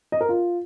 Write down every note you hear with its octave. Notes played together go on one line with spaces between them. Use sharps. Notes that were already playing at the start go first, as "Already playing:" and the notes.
D#5
A#4
F4